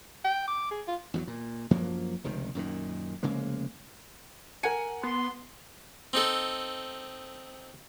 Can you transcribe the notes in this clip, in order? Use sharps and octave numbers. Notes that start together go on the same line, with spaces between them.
G5
D6
G#4
F4
E2 F3 F#3
A#2
F#2 F3 F#3 A#3
F1 C#2 C3 D#3
F#2 A#2 D3 D#3
F1 C#3 G#3 A#3
A#4 F#5 G#5 C#7
B3 C6
C4 D#4 A4